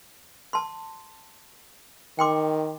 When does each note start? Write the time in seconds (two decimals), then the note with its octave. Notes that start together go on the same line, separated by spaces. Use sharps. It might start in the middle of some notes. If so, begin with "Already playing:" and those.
0.53 A5 C6
2.19 D#3 G5 C6 D6